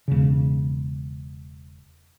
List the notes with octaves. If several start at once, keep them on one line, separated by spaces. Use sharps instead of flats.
E1 C#3